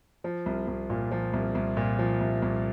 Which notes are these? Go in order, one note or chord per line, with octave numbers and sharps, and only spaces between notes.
F3
C2
C2
A#2
F3
C2
C2
A#2
F3
C2
C2